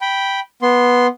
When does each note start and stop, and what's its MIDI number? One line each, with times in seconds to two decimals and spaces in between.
0.01 0.40 79
0.01 0.40 83
0.62 1.07 59
0.62 1.07 84